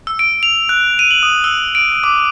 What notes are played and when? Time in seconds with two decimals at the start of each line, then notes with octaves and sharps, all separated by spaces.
0.07 E6
0.19 D7
0.43 F7
0.69 F#6
0.99 D#7
1.11 F#7
1.23 D#6
1.44 E6
1.75 D7
2.04 D6